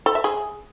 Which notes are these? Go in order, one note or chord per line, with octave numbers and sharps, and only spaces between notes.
A4
E5
G#4